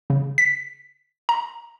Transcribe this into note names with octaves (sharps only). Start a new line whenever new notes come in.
C#3
B6
A#5